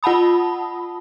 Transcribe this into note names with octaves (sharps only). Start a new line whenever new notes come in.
F4 F#5 A5 B5 D#6